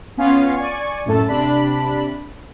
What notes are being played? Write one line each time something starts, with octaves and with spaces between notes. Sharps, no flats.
B3 C#4 F4 C#5 F5
D5 G#5 C#6
F#2 A2 A3 A4 A5
C3 D4 B5